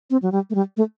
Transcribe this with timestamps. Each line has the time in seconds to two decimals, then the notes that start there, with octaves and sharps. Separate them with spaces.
0.10 C4
0.22 F#3
0.32 G3
0.50 A3
0.55 G3
0.77 A3